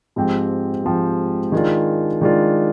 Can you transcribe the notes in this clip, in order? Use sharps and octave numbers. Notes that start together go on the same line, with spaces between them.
G#2 F3 G#3 C4 G4
G#2 F3 G#3 C4 G4
D#3 G#3 D4 F4
D#3 G#3 D4 F4